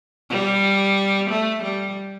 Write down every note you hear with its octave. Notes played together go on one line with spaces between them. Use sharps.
G3
A3
G3